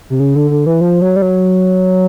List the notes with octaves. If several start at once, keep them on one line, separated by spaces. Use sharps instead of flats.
C3
C#3
D3
D3
E3
F3
F#3
G3
F#3